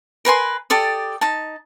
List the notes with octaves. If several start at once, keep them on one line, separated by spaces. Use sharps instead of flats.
A#4 B4 G#5 C6
G4 A4 D5 D#6
D#4 A5